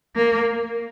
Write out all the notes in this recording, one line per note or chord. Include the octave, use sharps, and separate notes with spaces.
A#3